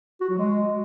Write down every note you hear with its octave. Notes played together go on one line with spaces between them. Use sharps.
F#4
F#3
G#3